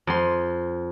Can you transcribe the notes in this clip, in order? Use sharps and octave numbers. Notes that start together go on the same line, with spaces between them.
F2 C6